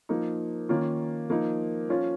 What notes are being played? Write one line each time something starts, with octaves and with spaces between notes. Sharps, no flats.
F3 A#3 D#4
D#3 A#3 C#4 F4
F3 A#3 D#4
F3 C#4 F4